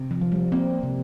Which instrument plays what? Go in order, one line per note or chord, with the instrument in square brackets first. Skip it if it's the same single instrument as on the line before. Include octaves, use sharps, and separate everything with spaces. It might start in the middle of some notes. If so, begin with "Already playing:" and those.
Already playing: [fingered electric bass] C3
[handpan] F3
[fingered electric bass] F3
[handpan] G3
[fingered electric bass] A#3 [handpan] C4
[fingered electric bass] C3